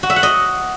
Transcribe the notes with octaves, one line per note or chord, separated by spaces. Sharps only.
F#4
E5
F#5
D#5